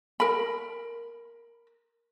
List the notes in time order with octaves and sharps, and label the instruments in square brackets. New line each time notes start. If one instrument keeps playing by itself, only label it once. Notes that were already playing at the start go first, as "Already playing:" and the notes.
[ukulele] A#4 B5